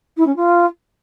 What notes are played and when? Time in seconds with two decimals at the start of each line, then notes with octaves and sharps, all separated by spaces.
0.17 E4
0.27 C#4
0.36 F4